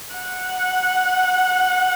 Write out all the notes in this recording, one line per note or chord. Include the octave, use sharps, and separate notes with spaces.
F#5